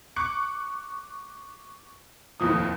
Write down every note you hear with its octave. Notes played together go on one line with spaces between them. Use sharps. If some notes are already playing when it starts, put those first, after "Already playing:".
C#6 D6 F#6 C#7
F1 D#2 A2 F3 D#6